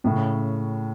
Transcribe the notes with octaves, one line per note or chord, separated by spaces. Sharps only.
A2 C#3